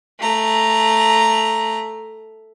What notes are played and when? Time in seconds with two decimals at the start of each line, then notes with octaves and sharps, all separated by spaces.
0.20 A3 A#5